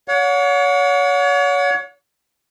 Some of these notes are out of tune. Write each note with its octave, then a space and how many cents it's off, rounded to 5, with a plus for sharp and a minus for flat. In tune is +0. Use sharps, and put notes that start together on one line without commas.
C#5 +35 F#5 -35